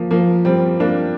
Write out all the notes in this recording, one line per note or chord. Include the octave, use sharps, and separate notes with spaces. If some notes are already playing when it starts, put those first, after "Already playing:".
Already playing: F3 A#3
F3 A#3
G3 C4
A#3 D4